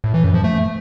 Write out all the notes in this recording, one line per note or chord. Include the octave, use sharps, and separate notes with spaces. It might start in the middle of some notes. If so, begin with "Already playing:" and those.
A2
E3
F#2
F3
A3